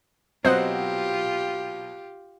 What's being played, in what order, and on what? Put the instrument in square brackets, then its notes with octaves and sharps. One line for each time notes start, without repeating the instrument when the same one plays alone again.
[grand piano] B2 F#3 C4 [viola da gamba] F4 G4 [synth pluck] C5 D#5 F#5